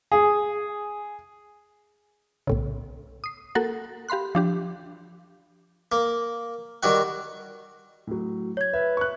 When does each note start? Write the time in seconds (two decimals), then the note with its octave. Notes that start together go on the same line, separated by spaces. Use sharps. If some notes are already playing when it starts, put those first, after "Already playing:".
0.12 G#4
2.47 B1 A2 C#3
3.24 D#6 C7
3.55 A#3 F#4 A4 A#4 F#5
4.09 G4 F5 B5 C6 F#6
4.35 F3 D4 G4
5.92 A#3
6.83 D#3 G3 F#4 F#5
8.07 A2 F#3
8.57 C#5 G#6
8.73 B4 E5
8.97 C#6 F#6